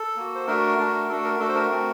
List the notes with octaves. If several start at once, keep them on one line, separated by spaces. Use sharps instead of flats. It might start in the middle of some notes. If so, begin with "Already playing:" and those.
Already playing: A4
A#3 F#4
C5
A3 D4 F#4 A#4
A3 D4 F#4
A3 D4 F#4 A4
A#4
A3 D4 F#4 A4
C5
A#4
A3 C4 F#4